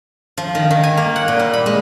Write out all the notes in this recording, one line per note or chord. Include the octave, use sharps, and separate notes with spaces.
F3
D#3
D#3
G#5
A#3
F#5
A#2
G3
B5
G#3